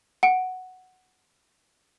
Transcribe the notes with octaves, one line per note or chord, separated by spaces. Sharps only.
F#5 D7